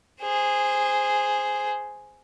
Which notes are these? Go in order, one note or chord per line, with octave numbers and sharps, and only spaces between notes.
G#4 C5